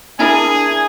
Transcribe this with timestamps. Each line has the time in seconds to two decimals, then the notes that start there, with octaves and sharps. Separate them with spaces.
0.19 D4 E4 G#4 A#4 G#5